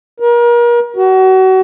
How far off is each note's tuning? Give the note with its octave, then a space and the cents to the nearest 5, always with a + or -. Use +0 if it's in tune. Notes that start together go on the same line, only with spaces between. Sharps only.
A#4 +35
F#4 +30